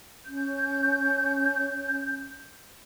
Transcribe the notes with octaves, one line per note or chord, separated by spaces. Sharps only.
C#4 G6